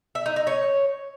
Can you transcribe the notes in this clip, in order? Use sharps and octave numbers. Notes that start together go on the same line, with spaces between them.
E5
D#4
D#4
C#5